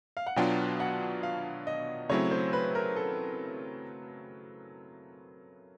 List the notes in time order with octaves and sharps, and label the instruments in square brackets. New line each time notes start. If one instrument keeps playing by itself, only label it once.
[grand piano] F5
F#5
[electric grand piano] B2 F#3 B3 D4 F4 [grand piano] G5
[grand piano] F#5
F5
D#5
[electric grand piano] C#3 F#3 A3 C4 E4 [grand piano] C#5
[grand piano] C5
B4
A#4
A4